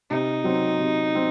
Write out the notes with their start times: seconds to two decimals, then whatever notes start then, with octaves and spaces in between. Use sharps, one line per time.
0.10 C3 D#4
0.44 F#3 C4
0.79 C3
1.14 F#3 C4